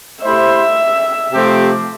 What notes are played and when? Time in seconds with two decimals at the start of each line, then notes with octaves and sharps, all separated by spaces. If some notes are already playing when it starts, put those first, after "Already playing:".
0.23 A3 E4 G4 C5 E5
1.32 C3 F3 A3 C4 G4